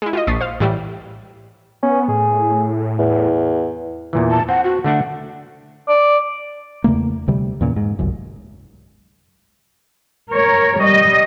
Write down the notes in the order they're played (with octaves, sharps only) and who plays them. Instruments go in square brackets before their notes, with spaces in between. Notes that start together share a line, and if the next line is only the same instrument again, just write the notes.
[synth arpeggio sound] G#3 E4
F4 F#4 D#5
A#1 C#6 D#6 A6 B6 C7
C5 F5
A2 E3 G3 E4
[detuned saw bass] B3 [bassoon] C#4
[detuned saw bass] A2 [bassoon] G#4
[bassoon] E2
[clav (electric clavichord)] E2 A#2 E3
[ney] A5
[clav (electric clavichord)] C4 [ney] F#5
[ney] F#4
[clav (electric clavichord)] D3 A3 D4 [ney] F#5
[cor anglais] D5
[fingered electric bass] E2 C#3 A3 A#3
D2 C3 G3
E2 A#2 C#3
G#2
G1 C2 F#2
[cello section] A#4 C#5
G3 D#5